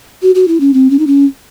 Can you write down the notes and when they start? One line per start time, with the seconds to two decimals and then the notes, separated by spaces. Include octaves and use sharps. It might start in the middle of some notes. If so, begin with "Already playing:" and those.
0.22 F#4
0.35 F#4
0.48 E4
0.60 C#4
0.74 C4
0.90 C#4
0.99 D#4
1.07 C#4